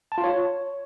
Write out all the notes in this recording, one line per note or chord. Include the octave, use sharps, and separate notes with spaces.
A5
F4
C#5